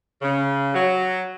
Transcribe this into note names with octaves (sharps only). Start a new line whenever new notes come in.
C#3
F#3